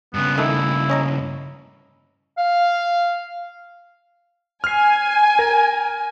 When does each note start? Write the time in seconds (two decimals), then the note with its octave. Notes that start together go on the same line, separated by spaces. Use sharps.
0.14 G2 C#3 B3
0.38 D#3 A3 E4
0.90 C#4 D#5 A#5
2.38 F5
4.64 G#5 F6 C7
5.39 A#4